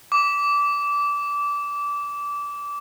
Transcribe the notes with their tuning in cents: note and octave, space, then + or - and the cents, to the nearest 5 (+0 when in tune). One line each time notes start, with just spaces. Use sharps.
D6 -20